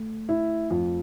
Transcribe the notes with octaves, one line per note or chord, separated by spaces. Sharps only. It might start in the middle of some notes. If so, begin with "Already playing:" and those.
Already playing: A3
E4
F2